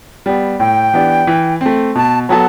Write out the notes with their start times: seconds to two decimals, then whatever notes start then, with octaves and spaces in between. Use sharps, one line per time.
0.26 G3 B3
0.59 A2 G5
0.94 E3 B3 D4 G4
1.27 E3
1.61 A3 C4
1.95 B2 A5
2.29 F#3 B3 F#4 A4 A5